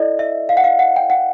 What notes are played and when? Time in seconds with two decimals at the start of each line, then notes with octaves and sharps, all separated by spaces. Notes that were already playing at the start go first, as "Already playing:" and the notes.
Already playing: E4 A4 D5 D#5
0.19 E5
0.49 F5
0.57 F#5
0.64 F5
0.79 F#5
0.96 G5
1.10 F#5